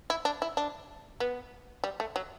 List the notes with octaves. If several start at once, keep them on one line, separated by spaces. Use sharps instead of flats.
E4
D4
E4
D4
B3
G3
A3
F#3